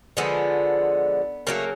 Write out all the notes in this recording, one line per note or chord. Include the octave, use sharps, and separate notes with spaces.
D3 F3 G#3 B3
C#3 F#3 A3 A#3